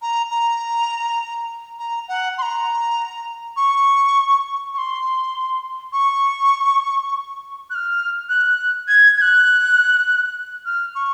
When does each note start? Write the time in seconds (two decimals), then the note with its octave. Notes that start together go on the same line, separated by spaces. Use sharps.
0.02 A#5
0.31 A#5
1.79 A#5
2.08 F#5
2.38 C6
2.42 A#5
3.57 C#6
4.74 C#6
4.78 C6
5.93 C#6
7.70 F#6
7.75 F6
8.29 F#6
8.88 G#6
9.17 G#6
9.22 F#6
10.66 F6
10.95 C#6